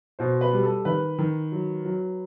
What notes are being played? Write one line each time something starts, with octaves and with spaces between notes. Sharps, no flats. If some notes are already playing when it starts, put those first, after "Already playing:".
B2 C5
B4
G3
A4
D#3 B4
D#3
F#3
F#3